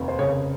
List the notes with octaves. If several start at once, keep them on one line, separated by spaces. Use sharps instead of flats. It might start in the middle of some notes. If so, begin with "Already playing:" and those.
Already playing: F1 D#2
C5
C#3 C#5